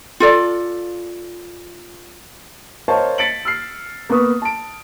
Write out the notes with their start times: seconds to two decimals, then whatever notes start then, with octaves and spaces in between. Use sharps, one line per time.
0.20 F4 A4 D5
2.88 A#4 C5 C#5 D#5 F5 A5
3.18 A6 B6 C#7 D7 F#7
3.45 E6 F6 C7
4.09 A#3 B3 B4 C#6 D#6
4.42 A5 D7